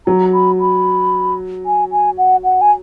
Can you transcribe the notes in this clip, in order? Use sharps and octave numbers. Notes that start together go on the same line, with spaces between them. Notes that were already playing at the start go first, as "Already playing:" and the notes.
F#3 A#5
B5
B5
G#5
G#5
F#5
F#5
G#5